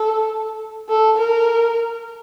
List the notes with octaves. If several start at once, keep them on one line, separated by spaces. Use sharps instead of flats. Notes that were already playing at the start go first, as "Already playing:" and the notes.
Already playing: A4
A4
A#4